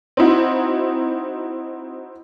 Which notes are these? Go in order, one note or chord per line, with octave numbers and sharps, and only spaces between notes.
C4 D#4 E4 F#4